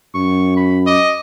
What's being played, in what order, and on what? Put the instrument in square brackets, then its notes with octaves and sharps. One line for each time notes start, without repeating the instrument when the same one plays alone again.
[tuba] F#2 [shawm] C#6
[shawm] B5
[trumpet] D#5 [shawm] D6